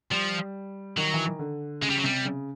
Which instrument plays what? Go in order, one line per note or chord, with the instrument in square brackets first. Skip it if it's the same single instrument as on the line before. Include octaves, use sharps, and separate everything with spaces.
[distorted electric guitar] F3 [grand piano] G3
[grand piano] D#3 [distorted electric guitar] F#3
[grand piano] E3
D#3
D3
[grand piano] C#3 [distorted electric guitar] G#3
[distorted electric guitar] G3
F#3
[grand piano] C3 [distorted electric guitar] G3
[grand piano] C#3